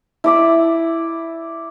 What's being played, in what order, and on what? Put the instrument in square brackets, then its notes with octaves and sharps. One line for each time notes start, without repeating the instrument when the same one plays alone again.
[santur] E4 D5 E5